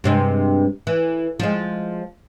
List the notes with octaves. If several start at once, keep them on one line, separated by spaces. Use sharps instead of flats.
G2 C3 G#3
E3
F3 G#3